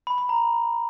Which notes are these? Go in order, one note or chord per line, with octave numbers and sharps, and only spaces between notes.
B5
B5
A#5